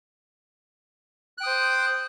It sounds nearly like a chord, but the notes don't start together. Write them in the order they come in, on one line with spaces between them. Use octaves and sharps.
F#6 G5 D#6 C5